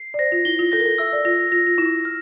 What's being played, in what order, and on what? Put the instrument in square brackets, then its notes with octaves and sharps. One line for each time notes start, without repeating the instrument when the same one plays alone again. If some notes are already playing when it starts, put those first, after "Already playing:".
Already playing: [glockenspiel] C7
[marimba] D5
[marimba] C5 [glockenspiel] A#6
[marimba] F4
[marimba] E4 [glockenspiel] G7
[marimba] F4
[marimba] A4 [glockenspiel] A#6
[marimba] A#4
A4
[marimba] E5 [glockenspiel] E6
[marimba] D5
[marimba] F4 [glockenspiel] A#6
[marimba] F4 [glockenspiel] A#6
[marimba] F4
[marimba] E4 [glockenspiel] E7
[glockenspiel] F6